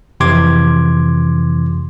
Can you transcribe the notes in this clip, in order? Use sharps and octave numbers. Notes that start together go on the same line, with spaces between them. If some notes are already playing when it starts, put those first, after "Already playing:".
F2 C3 E3 C6 D6 G#6